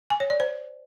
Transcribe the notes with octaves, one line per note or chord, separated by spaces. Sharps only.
G#5
C#5
D5
C5